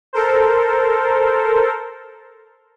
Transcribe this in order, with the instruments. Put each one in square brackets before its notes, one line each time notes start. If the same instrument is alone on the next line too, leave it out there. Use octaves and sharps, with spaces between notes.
[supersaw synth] A4 A#4 C5